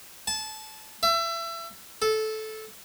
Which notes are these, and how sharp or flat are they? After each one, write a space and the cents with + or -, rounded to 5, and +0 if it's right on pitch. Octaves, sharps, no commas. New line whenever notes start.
A5 -25
E5 +30
A4 -15